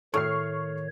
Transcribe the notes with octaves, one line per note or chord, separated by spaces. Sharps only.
A2 D#3 C#5 C#6 F6 C7